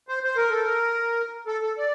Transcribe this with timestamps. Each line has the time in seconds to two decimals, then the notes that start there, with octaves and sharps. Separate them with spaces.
0.08 C5
0.24 C5
0.37 A#4
0.50 A4
0.63 A#4
1.47 A4
1.62 A4
1.78 D5